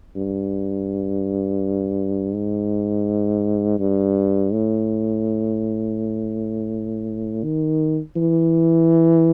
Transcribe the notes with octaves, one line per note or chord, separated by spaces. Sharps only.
G2
G#2
G2
A2
D#3
E3